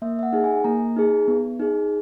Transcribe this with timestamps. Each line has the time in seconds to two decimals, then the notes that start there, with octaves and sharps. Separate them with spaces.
0.02 A#3 E5
0.19 E5
0.23 F#5
0.33 D#4 G#4
0.44 G#5
0.64 A#3 A#5
0.96 D#4 G#4
1.28 B3
1.60 D#4 G#4